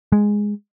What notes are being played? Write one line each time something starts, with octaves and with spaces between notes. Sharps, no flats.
G#3